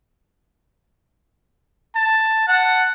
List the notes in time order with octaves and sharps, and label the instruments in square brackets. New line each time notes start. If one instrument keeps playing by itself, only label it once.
[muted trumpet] A5
[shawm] F#5 [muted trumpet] A5